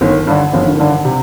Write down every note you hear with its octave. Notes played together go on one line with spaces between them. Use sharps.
G1 D#3
G2 D3
G1 F3
D#3
D3
D#3
G2 D3
C3